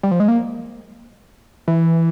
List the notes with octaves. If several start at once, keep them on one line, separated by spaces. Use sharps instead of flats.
G3
F3
G#3
A#3
E3